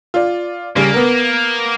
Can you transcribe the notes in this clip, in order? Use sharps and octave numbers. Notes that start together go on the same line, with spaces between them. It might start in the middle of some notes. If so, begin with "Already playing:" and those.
F4 D5
C#3 G3 A#3 C#4
B3 A#4